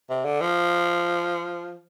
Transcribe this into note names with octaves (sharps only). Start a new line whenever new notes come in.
C3
D3
F3